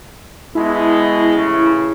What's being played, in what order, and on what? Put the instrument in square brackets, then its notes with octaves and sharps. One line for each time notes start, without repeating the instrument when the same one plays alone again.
[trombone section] B2 G#3 [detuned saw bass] E4
[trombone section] A1 C#3